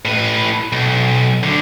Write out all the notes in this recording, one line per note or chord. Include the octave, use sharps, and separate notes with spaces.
A2 B4
B1
D2 D3